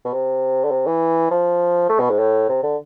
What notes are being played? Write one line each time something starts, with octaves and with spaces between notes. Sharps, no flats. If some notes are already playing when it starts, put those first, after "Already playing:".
B2
C3
D3
C3
E3
F3
A3
B2
G#2
A2
C3
D3